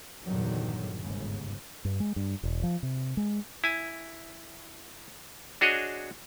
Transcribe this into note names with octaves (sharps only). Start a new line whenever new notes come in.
E2 G2 A#2 D3 D#3 F#3
G1 D#2 G#2 C#3
G2
G#3
G2
E1
F3
C3
G#3
E4 G#5
D4 F#4 G#4 C#5 D#5